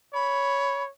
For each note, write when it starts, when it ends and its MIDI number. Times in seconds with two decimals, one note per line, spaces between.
0.14 0.89 73
0.14 0.83 83